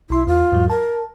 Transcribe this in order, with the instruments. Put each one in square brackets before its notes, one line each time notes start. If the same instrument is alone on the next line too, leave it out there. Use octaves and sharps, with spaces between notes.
[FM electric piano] B1 C6 [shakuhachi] E4
[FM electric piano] E2 [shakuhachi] F4
[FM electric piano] E2 G#2 F#3
[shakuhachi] A#4 [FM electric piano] A5